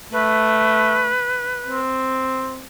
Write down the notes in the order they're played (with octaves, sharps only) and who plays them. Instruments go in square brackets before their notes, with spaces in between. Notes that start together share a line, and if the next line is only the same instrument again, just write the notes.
[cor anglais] A3 [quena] B4
[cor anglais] C4